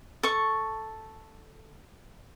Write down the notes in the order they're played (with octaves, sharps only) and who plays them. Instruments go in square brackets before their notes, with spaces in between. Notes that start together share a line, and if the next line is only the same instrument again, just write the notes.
[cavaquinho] A4 C#6